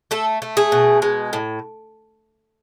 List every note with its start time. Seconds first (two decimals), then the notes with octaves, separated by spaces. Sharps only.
0.11 A3 A4
0.42 A3
0.57 G#4
0.72 B2
1.02 G#3
1.33 A2